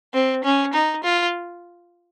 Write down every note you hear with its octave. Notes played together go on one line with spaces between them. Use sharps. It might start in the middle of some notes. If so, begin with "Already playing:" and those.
C4
C#4
D#4
F4